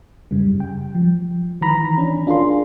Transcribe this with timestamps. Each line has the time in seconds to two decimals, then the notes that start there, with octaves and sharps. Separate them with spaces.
0.31 F#2 C#3 G3
0.60 G5
0.95 F3
1.61 D#3 E3 A#5 B5
1.98 C#4 D4
2.27 D4 F4 G#4 A#4 C6